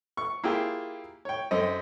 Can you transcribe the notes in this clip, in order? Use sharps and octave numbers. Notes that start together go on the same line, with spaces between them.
C#6
A#3 E4 F4 G4 G#4 G5
C#5 G5
F#2 C4 A4 D#5